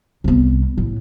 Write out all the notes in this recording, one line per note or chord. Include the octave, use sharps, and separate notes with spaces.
C2 B3
A2